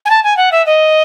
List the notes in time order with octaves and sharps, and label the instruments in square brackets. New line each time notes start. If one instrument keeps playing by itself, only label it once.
[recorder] G#5
A5
G#5
F#5
E5
D#5